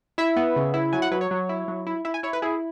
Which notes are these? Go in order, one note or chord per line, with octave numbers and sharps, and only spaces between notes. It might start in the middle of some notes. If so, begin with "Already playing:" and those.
E4 E5
B3
C#3
E4
F#3 G#5
F#5
F#3 B4
C#5
F#3
E4
F#3
E4
E4 E5
G#5
E4 C#5
B4
E4 G#4